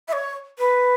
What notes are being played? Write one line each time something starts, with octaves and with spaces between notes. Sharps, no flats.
E5
C#5
B4